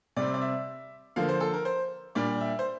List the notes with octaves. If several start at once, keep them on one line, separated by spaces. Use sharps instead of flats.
C3 G3 C4 D5
D5
E5
D3 F3 A#3 F5
C5
A4
A#4
C5
A#2 G3 D4 D5
E5
C5